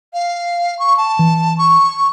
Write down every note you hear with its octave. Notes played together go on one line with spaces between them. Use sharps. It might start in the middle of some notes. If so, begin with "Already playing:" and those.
F5
C#6
A5
E3
C#6